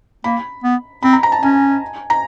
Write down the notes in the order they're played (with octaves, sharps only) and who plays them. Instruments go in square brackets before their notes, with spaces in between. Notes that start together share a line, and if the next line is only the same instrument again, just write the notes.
[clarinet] A#3 [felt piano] B5
[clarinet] B3
[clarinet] C4 [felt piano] B5
[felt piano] A#5
A#5
A5
[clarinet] C#4 [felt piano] G#5
[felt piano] A#5